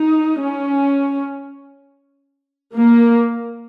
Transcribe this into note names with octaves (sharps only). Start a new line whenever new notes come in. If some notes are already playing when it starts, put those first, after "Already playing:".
Already playing: D#4
C#4
A#3